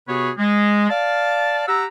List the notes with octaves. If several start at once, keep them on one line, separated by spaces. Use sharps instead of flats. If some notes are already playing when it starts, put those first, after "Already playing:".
C3 B3 F#4 G#4 B4 C#5
G#3
D5 F5 A5
G4 F#5 A#5 E6